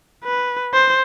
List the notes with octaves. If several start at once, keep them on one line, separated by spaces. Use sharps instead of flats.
B4
C5